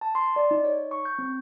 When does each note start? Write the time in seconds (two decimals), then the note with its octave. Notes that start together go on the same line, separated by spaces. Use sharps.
0.01 A5
0.15 C6
0.36 D5
0.51 D#4
0.64 C#5
0.91 C#6
1.05 G6
1.19 C4